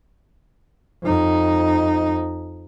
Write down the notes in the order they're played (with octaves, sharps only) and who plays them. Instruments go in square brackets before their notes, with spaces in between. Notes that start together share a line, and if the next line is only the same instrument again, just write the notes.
[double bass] F2 D#4